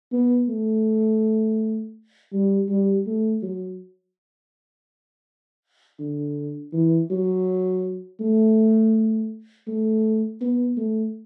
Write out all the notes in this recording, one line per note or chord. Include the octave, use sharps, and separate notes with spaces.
B3
A3
G3
G3
A3
F#3
D3
E3
F#3
A3
A3
B3
A3